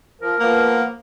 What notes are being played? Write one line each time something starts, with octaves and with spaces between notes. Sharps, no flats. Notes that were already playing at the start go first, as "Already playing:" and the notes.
F3 A#4
F3 A#3 B3